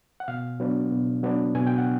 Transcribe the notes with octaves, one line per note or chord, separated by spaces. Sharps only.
F#5
B2 F5
F#3 B3 D4
B2
F#3 B3 D4
B2 G#5
G5
F#5